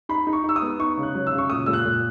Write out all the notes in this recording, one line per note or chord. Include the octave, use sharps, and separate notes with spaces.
D#4 B5
D#4
C#6
D#4 E6
D#6
B3
D#4 C#6
C#3
F#6
F#3
E6
C#3
C#6
A#2 D#6
A#2 E6
F#6
A#2